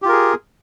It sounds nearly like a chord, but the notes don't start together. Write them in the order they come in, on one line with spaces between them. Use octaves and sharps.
G4 F4 A#4 G#4